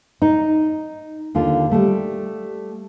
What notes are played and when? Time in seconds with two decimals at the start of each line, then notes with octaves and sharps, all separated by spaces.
0.22 D#4
1.35 D#2 D3 F4
1.71 G3 A3